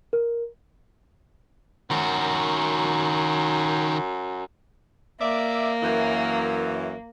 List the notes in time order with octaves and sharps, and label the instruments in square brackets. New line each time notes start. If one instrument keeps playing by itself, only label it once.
[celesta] A#4
[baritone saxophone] F#2 [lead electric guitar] D#3 F#4
[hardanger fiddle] A#3 [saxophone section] D5 E5
[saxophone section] F#2 E3